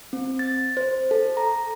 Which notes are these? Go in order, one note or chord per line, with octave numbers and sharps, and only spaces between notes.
C4
A6
C5
A4
A#5